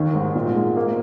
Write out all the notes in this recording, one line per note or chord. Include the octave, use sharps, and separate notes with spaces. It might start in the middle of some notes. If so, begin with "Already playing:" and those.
Already playing: D#2 D#3
G#2
A#2
G#3
A#3